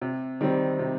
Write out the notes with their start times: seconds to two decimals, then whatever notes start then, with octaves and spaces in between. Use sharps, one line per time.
0.01 C3
0.41 D#3 G3 C4
0.79 C3